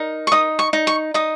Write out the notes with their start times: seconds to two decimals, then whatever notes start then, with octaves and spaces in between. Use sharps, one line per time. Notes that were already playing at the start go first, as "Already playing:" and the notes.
Already playing: D#4 A#4
0.27 C#6
0.32 D#4 D#6
0.59 C#6
0.73 D#4
0.87 C#6
1.14 D#4 D#6